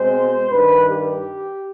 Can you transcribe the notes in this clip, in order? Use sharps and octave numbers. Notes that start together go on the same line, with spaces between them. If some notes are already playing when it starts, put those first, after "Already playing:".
Already playing: B2 G#3 C4 C5
G2 D#3 G3 B4
G4